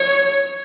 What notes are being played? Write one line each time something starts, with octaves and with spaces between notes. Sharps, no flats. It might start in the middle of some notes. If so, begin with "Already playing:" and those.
Already playing: C#5